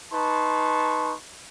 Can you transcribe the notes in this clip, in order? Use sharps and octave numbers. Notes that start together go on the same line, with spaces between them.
D#4 B4 A5 C6 C#6